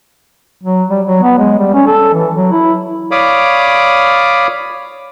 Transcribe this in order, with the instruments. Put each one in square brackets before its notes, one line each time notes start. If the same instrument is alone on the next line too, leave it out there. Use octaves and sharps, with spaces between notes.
[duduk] F#3
G3
F#3
B3
G#3
G3
C#4
A4
E3
F#3
E4
[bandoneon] C#5 D5 F5 B5 D6 D#6